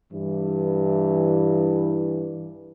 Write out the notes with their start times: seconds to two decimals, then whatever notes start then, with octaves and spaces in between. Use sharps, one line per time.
0.13 G2 E3